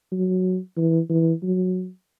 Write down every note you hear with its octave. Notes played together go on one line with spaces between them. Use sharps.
F#3
E3
E3
F#3